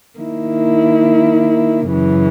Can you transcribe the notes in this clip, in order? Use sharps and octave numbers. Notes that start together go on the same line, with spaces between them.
D#3 A#3 E4
F#2 C#3 E3